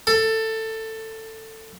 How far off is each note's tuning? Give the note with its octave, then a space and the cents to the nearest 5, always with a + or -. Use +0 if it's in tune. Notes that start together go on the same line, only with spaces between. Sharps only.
A4 +15